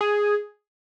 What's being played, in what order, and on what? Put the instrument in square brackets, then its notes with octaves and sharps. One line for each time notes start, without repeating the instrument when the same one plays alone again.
[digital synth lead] G#4